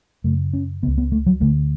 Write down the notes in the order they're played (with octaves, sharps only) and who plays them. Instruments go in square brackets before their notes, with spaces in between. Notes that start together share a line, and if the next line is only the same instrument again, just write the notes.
[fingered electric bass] F#2 C#3 A3
C#4
C#3 B3
C#2
B3
A3
F#3
D2 D3 A3